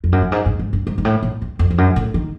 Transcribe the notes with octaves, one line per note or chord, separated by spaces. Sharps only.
F2
F#2
G2
G#2
G#2
G#2
G2
G#2
G#2
A2
A#2
E2
F2
F2
F#2
A2
D#3